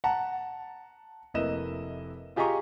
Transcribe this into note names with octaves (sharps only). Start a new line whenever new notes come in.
F#5 A5 A#5
F1 A#3 E4 B4 D#5 E7
F4 G4 G#4 D#5 A#5 C#6